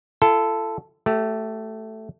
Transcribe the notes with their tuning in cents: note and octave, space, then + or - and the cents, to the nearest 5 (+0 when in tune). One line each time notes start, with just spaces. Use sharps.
F4 -45 A4 +0
A3 +0 G4 -40